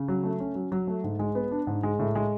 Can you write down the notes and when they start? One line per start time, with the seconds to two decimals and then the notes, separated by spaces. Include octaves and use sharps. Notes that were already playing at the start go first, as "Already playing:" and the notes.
Already playing: C#3
0.08 F#3
0.24 A3
0.40 C#4
0.55 F#3
0.72 F#3
0.87 A3
1.04 G#2
1.19 G#3
1.35 B3
1.51 D4
1.67 G#2
1.83 G#3
1.99 A2
2.15 G#3